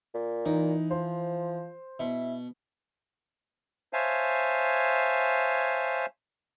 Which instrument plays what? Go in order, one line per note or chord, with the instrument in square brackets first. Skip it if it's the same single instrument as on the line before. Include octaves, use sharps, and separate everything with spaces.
[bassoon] A#2
[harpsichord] E3 [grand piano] D#4
[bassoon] F3 [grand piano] C5
[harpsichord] B2 [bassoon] E4
[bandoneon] C5 C#5 E5 F5 G#5 A5